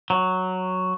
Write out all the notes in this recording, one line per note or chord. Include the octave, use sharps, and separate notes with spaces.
F#3